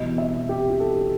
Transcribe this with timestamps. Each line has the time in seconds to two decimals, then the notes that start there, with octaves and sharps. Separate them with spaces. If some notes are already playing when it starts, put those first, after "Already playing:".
Already playing: E2 B2 G3 D#5
0.18 E5
0.49 G4
0.70 G4
0.80 A4